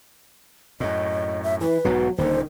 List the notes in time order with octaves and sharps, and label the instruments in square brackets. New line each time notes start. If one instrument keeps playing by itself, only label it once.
[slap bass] F#2 A2 [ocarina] D#5
[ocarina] E5
[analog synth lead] E3 [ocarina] B4
[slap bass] B1 G#2 B2 [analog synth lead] F#3
[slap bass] D#1 A#2 D3 [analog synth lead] D#3 [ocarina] C5